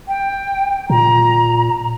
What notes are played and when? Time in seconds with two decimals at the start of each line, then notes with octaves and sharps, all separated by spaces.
0.08 G5
0.90 A#2 A#5